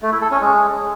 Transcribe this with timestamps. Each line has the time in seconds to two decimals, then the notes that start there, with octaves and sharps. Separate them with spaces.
0.02 A3
0.12 E4
0.22 A4
0.31 C#4
0.41 G#3